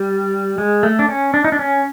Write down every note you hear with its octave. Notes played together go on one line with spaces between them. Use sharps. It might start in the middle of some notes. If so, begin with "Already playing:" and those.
Already playing: G3
G#3
A3
D4
C#4
D4
D#4
D4
C#4